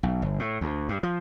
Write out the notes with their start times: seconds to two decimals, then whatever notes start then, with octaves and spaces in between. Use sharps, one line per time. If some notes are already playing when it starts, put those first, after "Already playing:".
0.03 B1
0.22 G1
0.39 A2
0.61 D2
0.89 G2
1.03 F3